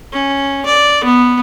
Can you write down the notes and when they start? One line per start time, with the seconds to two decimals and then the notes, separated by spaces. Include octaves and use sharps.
0.12 C#4
0.65 D5
1.04 B3